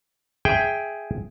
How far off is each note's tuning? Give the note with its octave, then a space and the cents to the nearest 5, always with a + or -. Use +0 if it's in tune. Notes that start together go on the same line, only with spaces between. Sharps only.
G#4 +0 E5 +0 G5 +0